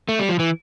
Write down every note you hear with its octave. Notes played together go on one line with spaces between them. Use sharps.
A3
G3
F3
E3